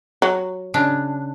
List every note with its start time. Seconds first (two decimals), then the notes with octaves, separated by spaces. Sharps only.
0.22 F#3
0.74 C#3 D4